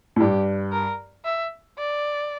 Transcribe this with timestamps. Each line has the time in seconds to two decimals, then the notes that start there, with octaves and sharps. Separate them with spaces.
0.16 A2
0.20 G2 G4
0.73 A#4
1.25 E5
1.78 D5